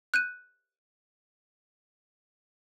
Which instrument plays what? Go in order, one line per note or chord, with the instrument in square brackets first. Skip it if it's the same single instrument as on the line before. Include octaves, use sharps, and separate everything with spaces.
[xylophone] F#6 G6 D#7